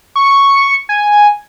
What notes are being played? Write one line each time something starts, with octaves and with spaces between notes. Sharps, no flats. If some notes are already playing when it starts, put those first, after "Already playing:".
C#6
G#5